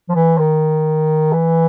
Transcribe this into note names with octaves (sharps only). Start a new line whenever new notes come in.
F3
E3
D#3
E3